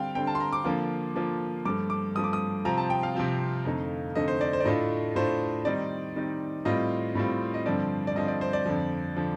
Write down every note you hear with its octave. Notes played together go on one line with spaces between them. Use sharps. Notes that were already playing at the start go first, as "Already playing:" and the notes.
Already playing: D3 G3 C4 F5 G5
D3 G3 C4 G5
A5
C6
A#5
D6
D3 F3 A#3 F4
D3 F3 A#3 F4
G2 F3 A3 D6
D6
G2 F3 A3 D#6
D6
D#6
C3 F3 C4 F4 A#5
A5
G5
F5
C3 F3 C4 F4
F2 D3 A3 D#4
F2 D3 A3 D#4 D#5
C5
D5
C5
D5
A2 A3 D4 F4 D#5
A2 A3 D4 F4 C5
D#3 G3 C4 D#4 D5
D#3 G3 C4 D#4
A2 G3 C4 F4 D#5
A2 G3 C4 F4
D#5
G2 D3 F3 C4 D5
D5
G2 D3 F3 C4 D#5
D5
C5
D5
F2 D3 F3
D3 F3